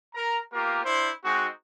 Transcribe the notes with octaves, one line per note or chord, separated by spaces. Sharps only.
A#4 A#5
A#3 B3 F4 G4 A#4
D4 E4 C5
G#3 C4 D#4 F#4